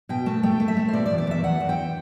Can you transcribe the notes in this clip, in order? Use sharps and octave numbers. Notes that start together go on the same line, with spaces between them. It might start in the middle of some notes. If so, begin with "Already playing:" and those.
B2 G5
A3 A5
A3 G5
A3
E5
A3
C5
B2 D5
D5
E2
D5
E2 E5
E2 F#5
E2
G5